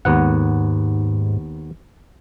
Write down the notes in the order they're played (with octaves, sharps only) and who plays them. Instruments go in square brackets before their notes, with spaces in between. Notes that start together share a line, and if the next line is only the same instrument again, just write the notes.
[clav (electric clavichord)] D#2 B3 F#5 [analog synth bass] G#2